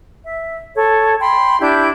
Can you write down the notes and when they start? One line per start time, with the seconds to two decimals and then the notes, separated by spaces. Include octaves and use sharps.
0.24 E5
0.76 A4 C#5
1.21 G5 B5 C6
1.61 D4 E4 G4 G6